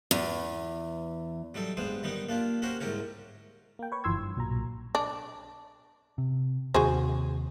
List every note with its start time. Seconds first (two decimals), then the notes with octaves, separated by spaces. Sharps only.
0.11 E2
1.54 F#3 G3 D#4 A4
1.77 G2 G#3 B3 C5
2.03 D#3 G3 B3 D#4
2.29 A#3 D4 F4 G4
2.62 C#4 F#4 G4 A#4 C5 C#5
2.80 C2 G#2 G4 A#4 C#5
3.79 A#3 G5
3.92 B4 C#5 C#6
4.04 G1 E3 F3 C6 E6 G#6
4.18 G2
4.36 B1 A#2 F#3 A#5
4.95 D4
6.18 C3
6.74 D#2 C3 F#4 G#4 C5